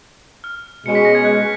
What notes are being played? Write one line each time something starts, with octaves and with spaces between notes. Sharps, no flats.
F6
B2 G#3 C#4 C#7
B6
A#6
G#6
F#6